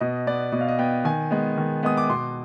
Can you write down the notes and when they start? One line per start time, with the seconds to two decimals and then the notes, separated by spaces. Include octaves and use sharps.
0.01 B2 D#5
0.27 B3 D5
0.52 B2 D#5
0.61 F5
0.68 D#5
0.79 B3 G5
1.05 D#3 G#5
1.31 G#3 B3
1.57 D#3
1.83 G#3 B3 D#6
1.97 D6
2.10 B2 C6